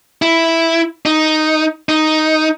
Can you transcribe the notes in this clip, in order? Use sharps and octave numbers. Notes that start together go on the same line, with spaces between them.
E4
D#4
D#4